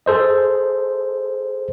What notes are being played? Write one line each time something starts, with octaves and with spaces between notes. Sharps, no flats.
G#4 A4 C5 D#5